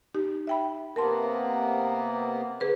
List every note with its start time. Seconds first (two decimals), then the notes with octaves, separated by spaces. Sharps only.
0.15 D#4 G4
0.47 E5 G5 B5
0.96 C3 A#3 B3 A#4 A5 C6
2.60 D3 G#4 B4 C5